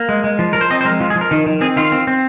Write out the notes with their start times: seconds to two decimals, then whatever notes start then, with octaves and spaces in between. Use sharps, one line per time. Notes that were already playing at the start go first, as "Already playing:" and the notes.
Already playing: A#3
0.09 G#3
0.24 G#3
0.39 F3
0.53 F3 A#4
0.61 C5
0.70 C4 D#5
0.81 C5
0.85 G#3 A#4
1.00 F3 F4
1.10 G#4
1.16 F3
1.21 A#4
1.31 D#3
1.46 D#3
1.61 C4 G#4
1.76 D#3 F4
1.92 C4
2.07 C4